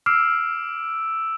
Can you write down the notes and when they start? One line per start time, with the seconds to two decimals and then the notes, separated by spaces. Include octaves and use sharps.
0.06 D6 E6 F6 C7 D7